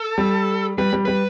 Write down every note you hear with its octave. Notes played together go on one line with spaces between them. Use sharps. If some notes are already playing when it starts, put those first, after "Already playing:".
Already playing: A4
G3
G3 B4
G3
G3 B4